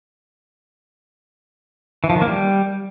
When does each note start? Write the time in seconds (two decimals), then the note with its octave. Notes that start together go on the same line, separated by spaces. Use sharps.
2.04 E3
2.10 F3
2.16 D#3
2.22 A#3
2.28 G3